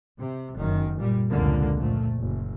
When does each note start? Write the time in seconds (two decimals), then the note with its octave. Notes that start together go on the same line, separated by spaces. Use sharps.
0.18 C3
0.57 F#1 F#2 D#3
0.98 A#2 G3
1.30 F1 C#2 D3 A#3
1.77 F2 A#2 A3
2.20 F#1